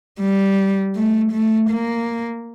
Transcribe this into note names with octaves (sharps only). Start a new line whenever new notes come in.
G3
A3
A3
A#3